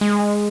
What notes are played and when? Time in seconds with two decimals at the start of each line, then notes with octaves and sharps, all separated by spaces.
0.01 G#3